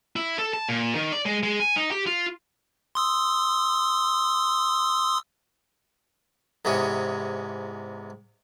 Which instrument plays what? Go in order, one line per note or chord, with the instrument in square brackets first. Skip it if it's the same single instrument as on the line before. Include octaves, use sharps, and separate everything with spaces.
[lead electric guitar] E4
A4
A5
A#2
D#3
D5
G#3
G#3
G#5
D#4
G4
F4
[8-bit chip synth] C6 D#6 E6
[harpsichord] E2 G#2 C3 C#4